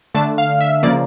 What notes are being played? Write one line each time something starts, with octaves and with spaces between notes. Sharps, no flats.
D3 A3 D4 A5
F5
E5
C#3 F3 A#3 D5